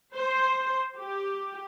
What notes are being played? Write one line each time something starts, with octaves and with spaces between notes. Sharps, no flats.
C5
G4